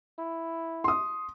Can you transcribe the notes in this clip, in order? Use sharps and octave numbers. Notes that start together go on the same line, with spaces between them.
E4
C6 D#6